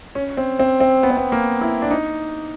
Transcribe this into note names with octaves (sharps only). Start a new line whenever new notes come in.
C#4
C4
C4
C4
B3
C4
B3
A#3
E4
D4
D#4